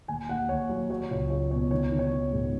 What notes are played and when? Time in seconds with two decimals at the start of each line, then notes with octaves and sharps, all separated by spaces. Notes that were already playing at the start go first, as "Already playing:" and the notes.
0.08 D#2 G#5
0.29 D#2 F#5
0.49 D#2 C#5
0.69 F#3
0.90 F#3 C#5
1.11 C#2 C#5
1.30 C#2 C#5
1.51 B2 C#5
1.71 D#3 C#5
1.91 D#3
1.99 C#5
2.12 D#3
2.32 G#2